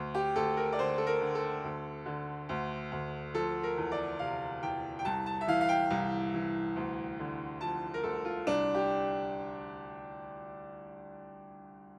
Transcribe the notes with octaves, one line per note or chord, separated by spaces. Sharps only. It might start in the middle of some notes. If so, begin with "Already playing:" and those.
Already playing: D2
G4
D2 A4
A#4
D5
D3 C5
A4
A#4
D3
A4
D2
D3
D2
D2
F3 A4
A#4
E2
D5
C3 F5
E2 G5
G5
C2 A5
A5
E5
E3 F5
F5
G5
C2
E3
D2
D3
F3 A5
A#4
D2 A4
F4
C2 D4
G4